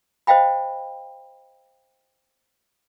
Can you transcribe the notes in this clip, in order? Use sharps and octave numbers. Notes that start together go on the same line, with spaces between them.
C5 D#5 F5 G5 B5